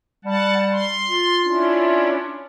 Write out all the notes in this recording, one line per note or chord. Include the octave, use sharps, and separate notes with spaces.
G3 F#5 A5
C6
F4
C#4 D4 E4